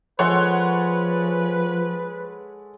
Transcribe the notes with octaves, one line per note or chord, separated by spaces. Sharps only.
F3 G#3 A4 B4 C#5 F#5 C6